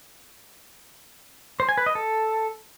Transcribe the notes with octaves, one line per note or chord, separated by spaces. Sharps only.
C5
G#5
B4
D#5
A4